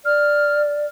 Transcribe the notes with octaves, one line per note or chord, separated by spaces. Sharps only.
D5 F6